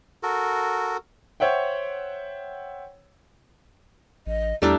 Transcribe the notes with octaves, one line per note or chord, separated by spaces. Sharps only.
F#4 A4 A#4
C5 C#5 E5 F#5 G5
A1 D#5
E2 G3 A3 D4 E4 A#5